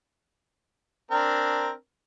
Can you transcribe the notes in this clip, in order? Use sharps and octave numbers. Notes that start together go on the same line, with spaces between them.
C4 D4 A#4